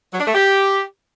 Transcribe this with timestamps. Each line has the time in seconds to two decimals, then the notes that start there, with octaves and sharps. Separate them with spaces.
0.13 F#3
0.20 D4
0.27 A3
0.34 G4